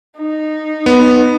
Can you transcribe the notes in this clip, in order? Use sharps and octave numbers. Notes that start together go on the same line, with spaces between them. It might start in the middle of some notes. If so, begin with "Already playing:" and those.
D#4
B3